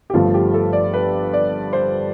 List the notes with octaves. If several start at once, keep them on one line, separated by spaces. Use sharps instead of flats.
G4
G1 G2 F3 A3 F4
G4
A4
D5
B4
D5
C5